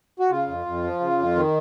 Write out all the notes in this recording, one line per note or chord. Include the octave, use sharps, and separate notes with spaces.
F#4
C#3 F4
F2
F2
F3
C#3
F2
D#3